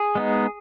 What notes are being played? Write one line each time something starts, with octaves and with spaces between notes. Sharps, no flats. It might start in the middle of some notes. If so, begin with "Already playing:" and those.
Already playing: G#4
G#3 B3 D#4